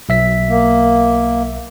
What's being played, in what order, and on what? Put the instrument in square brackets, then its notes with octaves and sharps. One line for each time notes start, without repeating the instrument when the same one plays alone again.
[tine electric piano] B1 E5 B6
[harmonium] A#3